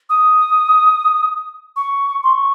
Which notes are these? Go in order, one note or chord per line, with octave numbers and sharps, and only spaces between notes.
D#6
C#6
C6
C#6